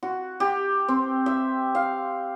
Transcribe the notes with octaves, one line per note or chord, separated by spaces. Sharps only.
F#4
G4
C4
E5
F5